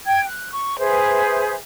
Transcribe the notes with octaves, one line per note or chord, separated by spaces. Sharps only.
G5 G#6
F#6
C#6
G#4 B4 C5 E5